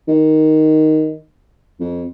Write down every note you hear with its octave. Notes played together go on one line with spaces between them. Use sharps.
D#3
F2